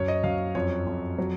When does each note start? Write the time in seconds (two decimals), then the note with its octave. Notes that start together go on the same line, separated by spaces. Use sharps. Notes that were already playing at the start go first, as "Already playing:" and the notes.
Already playing: F#2 C#5
0.08 D#5
0.24 F#2 F5
0.55 F2 C#5
0.87 F2
1.18 F#3